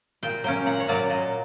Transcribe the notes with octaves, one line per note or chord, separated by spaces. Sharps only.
A#2 G5
F#3 A#3 C#4 G5
A#2 F#5
C#5
F#3 A#3 C#4 D5
A#2 D#5